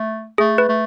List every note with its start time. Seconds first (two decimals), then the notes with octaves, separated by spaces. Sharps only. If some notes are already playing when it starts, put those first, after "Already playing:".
Already playing: A3
0.38 A3 G#4
0.58 B4
0.69 A3